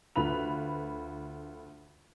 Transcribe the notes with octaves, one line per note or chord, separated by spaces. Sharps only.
D2 D3 F4 B4 B5 F7